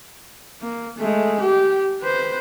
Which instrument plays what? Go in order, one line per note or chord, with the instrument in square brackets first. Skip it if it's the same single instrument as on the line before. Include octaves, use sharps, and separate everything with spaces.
[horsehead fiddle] A#3
G#3 A3
G4
B4 C5